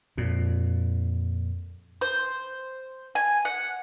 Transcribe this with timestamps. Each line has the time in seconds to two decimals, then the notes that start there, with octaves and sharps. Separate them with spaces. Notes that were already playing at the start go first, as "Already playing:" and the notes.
0.17 F2 A#2
2.01 C5
3.15 G#5
3.45 F#5